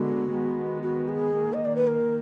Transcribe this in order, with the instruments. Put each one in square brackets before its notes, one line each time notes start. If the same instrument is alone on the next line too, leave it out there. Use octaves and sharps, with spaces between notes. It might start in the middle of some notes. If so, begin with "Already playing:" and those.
Already playing: [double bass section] D3 G#3 B3 [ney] F#4
[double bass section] D#3 G#3 B3
[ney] F#4
G#4
[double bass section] D#3 A#3
[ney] D#5
D5
B4
A#4